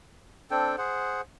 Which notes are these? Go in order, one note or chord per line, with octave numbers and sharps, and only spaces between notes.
C4 D4 A4 G5
G#4 C5 F#5